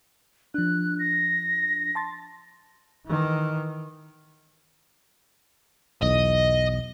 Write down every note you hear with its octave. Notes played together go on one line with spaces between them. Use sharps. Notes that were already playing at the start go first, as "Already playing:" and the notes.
F3 D4 F#6
A#6
A5 C6 A6
D#3 E3
B1 E2 D#5